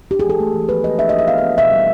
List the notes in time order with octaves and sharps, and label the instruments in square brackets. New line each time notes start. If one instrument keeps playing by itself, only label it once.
[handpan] D4 G4
G#4
E3 A4
A3
E3
F3 B4
A#3 D#5
D4 E5
D#5
D4
E5
B3 F5
E5
B3
B2 E5
G3